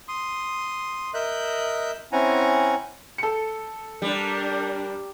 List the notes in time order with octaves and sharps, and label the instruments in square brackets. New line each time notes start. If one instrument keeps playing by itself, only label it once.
[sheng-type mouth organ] C6 D#6
A#4 D#5 E5 F#6 G6
C4 C#4 E4 F#5 G#5 A#5
[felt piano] A4 C#7
[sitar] G3 [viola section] D4 A#4